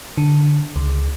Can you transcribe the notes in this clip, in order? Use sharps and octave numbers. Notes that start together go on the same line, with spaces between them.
D3
C#2